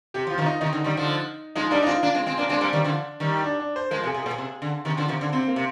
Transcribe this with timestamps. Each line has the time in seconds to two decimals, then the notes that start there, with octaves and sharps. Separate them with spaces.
0.14 C3 G4
0.27 F3 F4
0.38 C3 D#3
0.46 D#4
0.61 C3 D#3 D#4
0.73 D3
0.84 D#3 G3
0.97 D3 F3
1.56 F3 G#3 D#4
1.71 G3 A#3 D4
1.83 D#4
1.86 G#3 C4 F4
2.03 A#3 D4
2.15 G#3 C4
2.26 G#3 C4
2.38 A#3 D4
2.49 G#3 C4 D4
2.61 G3 A#3
2.73 D#3 G3
2.85 D3 F3
3.20 D#3 G3
3.44 D4
3.60 D4
3.76 C5
3.91 F3 G#3 A#4
4.04 C3
4.07 G#4
4.14 C3
4.22 A#2 G#4
4.38 C3
4.62 D3
4.85 C3 D#3
4.97 D3 F3
5.08 C3 D#3
5.21 D3
5.33 C3 C4
5.48 A#3
5.56 C3